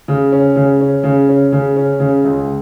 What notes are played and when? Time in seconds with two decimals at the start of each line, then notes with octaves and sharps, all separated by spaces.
0.08 C#3
0.32 C#4
0.56 C#3
0.80 C#4
1.04 C#3
1.29 C#4
1.52 C#3
1.76 C#4
2.00 C#3
2.24 C#2